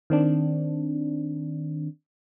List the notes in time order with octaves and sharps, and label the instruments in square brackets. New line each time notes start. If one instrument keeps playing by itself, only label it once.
[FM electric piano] D#3 C4 D4